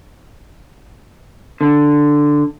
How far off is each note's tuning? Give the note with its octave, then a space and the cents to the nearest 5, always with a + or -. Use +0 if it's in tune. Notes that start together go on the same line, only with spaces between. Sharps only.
D3 +5